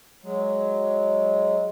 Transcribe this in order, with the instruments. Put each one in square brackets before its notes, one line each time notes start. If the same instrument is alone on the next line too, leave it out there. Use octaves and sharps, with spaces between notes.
[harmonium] F#3 G#3